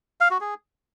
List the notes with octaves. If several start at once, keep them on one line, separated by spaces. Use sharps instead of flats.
F5
F#4
G#4